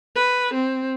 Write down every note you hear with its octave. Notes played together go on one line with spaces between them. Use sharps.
B4
C4